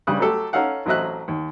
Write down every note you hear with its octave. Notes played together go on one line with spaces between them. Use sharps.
G2 C#3 G3 D#6 F#6
F#3 A3 G4 A4
C#4 D#4 A4 F5 F#5
A1 F#3 C4 D#5 E5 F#6
D#2